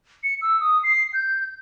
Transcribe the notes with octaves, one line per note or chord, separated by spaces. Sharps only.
C#7
E6
D#6
C7
G6